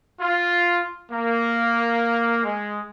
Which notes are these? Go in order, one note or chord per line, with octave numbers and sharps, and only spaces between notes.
F4
A#3
G#3